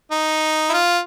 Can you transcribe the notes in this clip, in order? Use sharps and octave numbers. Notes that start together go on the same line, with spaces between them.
D#4
E4
F4